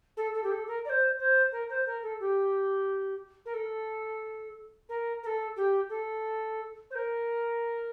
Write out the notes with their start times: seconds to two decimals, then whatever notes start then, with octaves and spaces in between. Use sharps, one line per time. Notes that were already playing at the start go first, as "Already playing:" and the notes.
0.17 A4
0.34 A4
0.44 G4
0.52 A4
0.68 A#4
0.85 D5
0.90 C5
1.19 C5
1.52 A#4
1.70 C5
1.86 A#4
2.03 A4
2.20 G4
3.46 A#4
3.54 A4
4.89 A#4
5.23 A#4
5.27 A4
5.56 G4
5.90 A4
6.91 C5
6.95 A#4